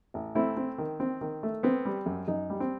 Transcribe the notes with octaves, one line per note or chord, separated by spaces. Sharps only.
A1
A3 C4 E4
C4
D#3
C4
D#3
A3
B3 C4
G3
F#2
F#2 D#4
G3
C4